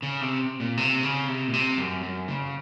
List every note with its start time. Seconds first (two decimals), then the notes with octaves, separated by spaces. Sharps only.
0.03 C#3
0.21 C3
0.60 A#2
0.77 C3
1.03 C#3
1.28 C3
1.48 A#2
1.54 C3
1.78 F#2
2.03 F#2
2.28 C#3